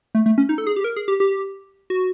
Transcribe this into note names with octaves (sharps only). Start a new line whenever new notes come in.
A3
A3
C#4
D#4
A4
G#4
G4
A#4
G#4
G4
G4
F#4